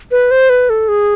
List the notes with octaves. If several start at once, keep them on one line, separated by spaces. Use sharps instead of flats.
B4
C5
B4
A4
G#4